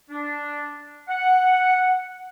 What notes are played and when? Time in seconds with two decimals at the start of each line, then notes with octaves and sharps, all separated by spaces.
0.10 D4
1.08 F#5